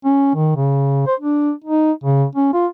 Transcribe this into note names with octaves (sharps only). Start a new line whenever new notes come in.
C#4
D#3
C#3
C5
D4
D#4
C#3
C#4
F4